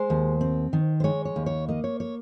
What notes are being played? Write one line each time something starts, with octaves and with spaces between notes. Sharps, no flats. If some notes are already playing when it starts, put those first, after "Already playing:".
Already playing: G#3 C5
D#2
C4
D#3
C5
G#3 C#5
C#5
D#2
C#5
A#3 D#5
C#5
C#5